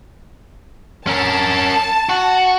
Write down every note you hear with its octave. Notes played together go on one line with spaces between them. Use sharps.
C#4 A#4 A5
F#4